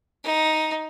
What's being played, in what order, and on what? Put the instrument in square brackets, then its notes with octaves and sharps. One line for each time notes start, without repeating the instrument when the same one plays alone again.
[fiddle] D#4